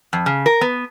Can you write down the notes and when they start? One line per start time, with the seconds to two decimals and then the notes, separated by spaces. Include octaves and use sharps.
0.13 F2
0.26 C#3
0.46 A#4
0.61 B3